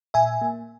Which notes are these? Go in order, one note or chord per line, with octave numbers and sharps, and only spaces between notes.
A#2 E5 G#5
A#3